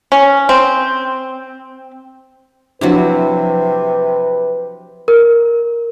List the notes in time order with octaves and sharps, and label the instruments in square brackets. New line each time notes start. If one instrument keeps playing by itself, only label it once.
[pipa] C#4
C4
[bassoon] C3 [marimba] F3 D4 [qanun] F#3 C4 E4 [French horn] B4
[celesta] A#4